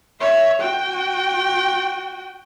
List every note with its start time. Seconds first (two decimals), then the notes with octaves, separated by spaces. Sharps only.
0.20 C#5 E5
0.61 F#4 G5